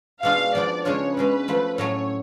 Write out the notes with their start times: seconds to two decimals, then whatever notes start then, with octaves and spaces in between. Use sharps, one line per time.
0.23 B2 G#3 D4 F4 F5
0.55 F3 B3 D4 F4 D5
0.85 C#3 G#3 D4 F4 C#5
1.17 B2 G#3 C#4 B4
1.48 F3 A3 F4
1.78 A2 F#3 A3 C#4 C#5